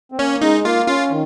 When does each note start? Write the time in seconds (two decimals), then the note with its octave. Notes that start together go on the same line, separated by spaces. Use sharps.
0.12 C4
0.18 A#3 C#4
0.41 G#3 D#4
0.64 A#3 F4
0.87 C#4 F4
1.10 D#3